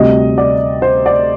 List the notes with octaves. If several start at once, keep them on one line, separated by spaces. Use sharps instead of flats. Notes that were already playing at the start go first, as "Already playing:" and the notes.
Already playing: D2 C3 G3 D#5
D5
C5
D5